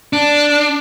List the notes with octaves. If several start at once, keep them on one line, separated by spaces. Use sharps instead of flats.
D4